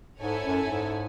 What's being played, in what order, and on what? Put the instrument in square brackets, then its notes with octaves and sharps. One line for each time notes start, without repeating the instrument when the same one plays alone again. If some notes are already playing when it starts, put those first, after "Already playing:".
[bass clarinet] G#2 [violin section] A3 E4 A4 C#5 G#5
[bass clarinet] F#2
G#2